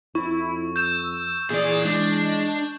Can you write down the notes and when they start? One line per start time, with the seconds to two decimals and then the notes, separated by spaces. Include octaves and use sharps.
0.15 F2 E4 C#6
0.76 E6 G6 E7
1.50 A#2 E3 G#4 D5
1.85 G#3 D4